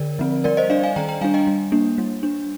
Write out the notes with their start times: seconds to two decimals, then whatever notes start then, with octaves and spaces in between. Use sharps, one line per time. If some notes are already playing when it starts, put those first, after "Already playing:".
Already playing: D3 A#4 D5
0.19 F3 C4
0.44 G3 A#4 D5
0.57 C5 D#5
0.70 D4 D5 F5
0.83 F5 G#5
0.96 D#3 G5 A#5
1.09 G5 A#5
1.21 G3 D4 F5 G#5
1.34 D#5 G5
1.47 G3
1.72 A#3 D4
1.98 G3
2.23 D4